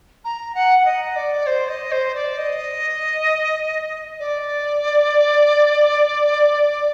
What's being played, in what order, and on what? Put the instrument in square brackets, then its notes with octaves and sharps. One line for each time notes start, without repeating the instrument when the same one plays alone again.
[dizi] A#5
F#5
F#5
D#5
D5
C5
D#5
C5
D5
D#5
D5